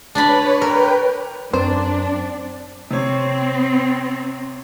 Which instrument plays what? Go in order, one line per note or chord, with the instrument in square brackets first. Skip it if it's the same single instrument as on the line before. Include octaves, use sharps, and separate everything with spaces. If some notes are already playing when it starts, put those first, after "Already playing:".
[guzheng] D4 D5 B5 [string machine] B4 C#5
[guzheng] A#4 [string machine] B4 G5
[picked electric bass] F#2 [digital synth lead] C4 [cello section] D4 [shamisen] C5
[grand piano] C3 C#5 [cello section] C4